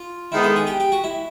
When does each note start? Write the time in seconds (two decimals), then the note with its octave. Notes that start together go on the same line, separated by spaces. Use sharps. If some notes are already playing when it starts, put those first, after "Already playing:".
Already playing: F4
0.31 D#3 G#3 B3 E4
0.43 A4
0.56 G#4
0.67 G4
0.80 G4
0.92 F#4
1.04 E4